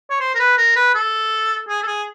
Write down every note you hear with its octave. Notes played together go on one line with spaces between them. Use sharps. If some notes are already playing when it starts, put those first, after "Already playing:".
C#5
C5
A#4
B4
A#4
B4
A4
G#4
A4
G#4